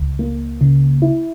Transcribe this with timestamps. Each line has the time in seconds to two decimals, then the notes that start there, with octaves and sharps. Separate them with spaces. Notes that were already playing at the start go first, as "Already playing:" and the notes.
Already playing: C#2
0.19 A#3
0.61 C#3
1.02 E4